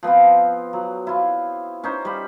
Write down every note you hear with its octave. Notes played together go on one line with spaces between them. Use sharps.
F3 B3 C4 F4
F#3
E4 F4
C#4 D#4 C5
G3 B5